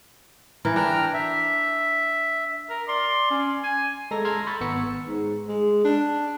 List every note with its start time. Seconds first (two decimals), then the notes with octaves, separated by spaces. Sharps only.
0.65 E3 A#4
0.76 D4 G5 A#5 F6
1.14 E5
2.70 A#4
2.88 D5 C6
3.31 C#4
3.63 G#5
4.11 G#3 A4 A#5 A#6
4.25 A#5 C6 E6 F6 G#6
4.47 B5 C#6 G6 A6
4.61 G#1 B3 E6 C#7
5.07 G#2
5.48 G#3
5.84 D4